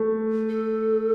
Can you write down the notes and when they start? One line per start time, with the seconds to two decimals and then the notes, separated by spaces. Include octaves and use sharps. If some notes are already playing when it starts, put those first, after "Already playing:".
Already playing: A3
0.49 A4